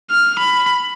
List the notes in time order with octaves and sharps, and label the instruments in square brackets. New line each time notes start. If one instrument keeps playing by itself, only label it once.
[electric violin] F6
B5